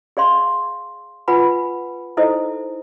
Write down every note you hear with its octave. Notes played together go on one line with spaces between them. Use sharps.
G#4 D5 F5 C6
F4 B4 F#5 G#5 B5
D#4 E4 A4 C5 D#5